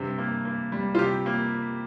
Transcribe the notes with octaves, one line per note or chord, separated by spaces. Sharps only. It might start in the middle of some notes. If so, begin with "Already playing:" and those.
Already playing: G2 C3
A#3
A#3
G3
F4
C3 G4
A#3